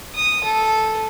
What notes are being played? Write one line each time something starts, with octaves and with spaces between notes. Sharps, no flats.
D#6
A4